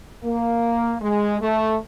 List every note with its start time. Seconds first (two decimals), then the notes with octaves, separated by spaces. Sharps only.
0.24 A#3
1.01 G#3
1.41 A3